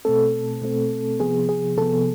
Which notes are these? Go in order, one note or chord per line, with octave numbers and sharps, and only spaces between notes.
B2 A3 C4 A4
B2 A3 C4
C3 F3 B3 G#4
G#4
C3 F3 B3 A4